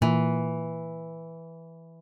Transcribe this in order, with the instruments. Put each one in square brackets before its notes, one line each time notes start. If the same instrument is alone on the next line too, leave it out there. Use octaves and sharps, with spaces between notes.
[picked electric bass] A#2 [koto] E3